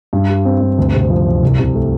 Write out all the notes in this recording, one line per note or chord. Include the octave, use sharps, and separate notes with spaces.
G2
G3
C4
G2
D2
C3
F3
D2
C2
C3
A3